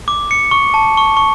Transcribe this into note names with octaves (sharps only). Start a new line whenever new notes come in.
D6
C#7
C#6
A5
C#6
C#6